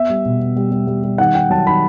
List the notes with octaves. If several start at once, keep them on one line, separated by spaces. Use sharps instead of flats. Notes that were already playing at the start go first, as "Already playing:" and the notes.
Already playing: B3 E5
G3
B2
B3
G3
G3
G3
G3
D#3 F#5
D#3 G5
F#3 A5
D#3 B5